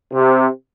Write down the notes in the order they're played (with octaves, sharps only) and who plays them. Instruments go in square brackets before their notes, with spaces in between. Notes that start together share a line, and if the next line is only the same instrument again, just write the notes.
[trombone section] C3